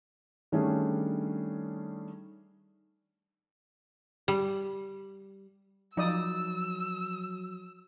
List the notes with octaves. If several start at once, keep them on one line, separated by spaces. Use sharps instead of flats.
D#3 G3 A3 C#4 D4 G#4
G3
F3 F#3 D#4 D5 D#6 E6